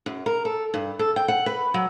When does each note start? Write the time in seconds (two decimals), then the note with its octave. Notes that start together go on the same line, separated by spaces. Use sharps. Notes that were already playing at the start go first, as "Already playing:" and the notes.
0.06 F#2
0.26 A#4
0.45 A4
0.74 G2
0.99 A4
1.16 G5
1.28 F#5
1.46 B4
1.74 F#3